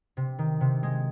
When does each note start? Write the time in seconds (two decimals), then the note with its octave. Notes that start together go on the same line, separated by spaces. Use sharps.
0.17 C3
0.39 D#3
0.61 C3
0.83 G#3